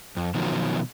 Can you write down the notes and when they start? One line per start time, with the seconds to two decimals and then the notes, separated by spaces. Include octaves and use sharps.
0.17 F2
0.35 B2 D#3 F3 F#3